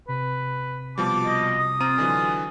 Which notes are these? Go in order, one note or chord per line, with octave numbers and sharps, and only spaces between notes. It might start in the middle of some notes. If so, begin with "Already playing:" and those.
C3 B4
B2 F3 G3 A5 D6
D#5
D#6
C4 F4 A#5 D#7
D3 E3 F#3 G#5